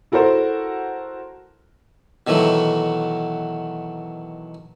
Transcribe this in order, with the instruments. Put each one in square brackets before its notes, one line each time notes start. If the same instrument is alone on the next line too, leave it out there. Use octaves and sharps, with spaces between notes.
[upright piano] E4 F#4 A4 A#4 C5
[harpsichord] B2 D#3 E3 F#3 A3